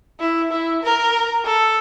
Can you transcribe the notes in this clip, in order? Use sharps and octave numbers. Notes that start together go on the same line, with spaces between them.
E4
E4
A#4
A4